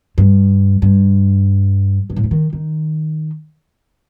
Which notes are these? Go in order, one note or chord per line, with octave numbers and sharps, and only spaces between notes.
G2
G2
G2
A2
G2
D#3
D#3